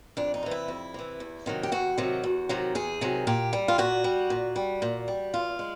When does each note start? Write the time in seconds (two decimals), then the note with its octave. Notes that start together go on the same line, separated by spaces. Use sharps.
0.17 F2 D4
0.34 D#4
0.43 C3 E3
0.51 E4
0.68 F2
0.94 C3 E3
1.20 E2
1.46 C3 D#3 F#3
1.63 G4
1.72 E2 F#4
1.98 C3 D#3 F#3
2.24 E2
2.49 C3 D#3 F#3
2.75 E2 G#4
3.01 C3 D#3 F#3
3.27 A#2 G4
3.53 G3
3.68 F4
3.78 A#2 F#4
4.04 G3
4.30 A#2
4.56 G3
4.82 A#2
5.08 G3
5.34 E2 F4
5.59 G#3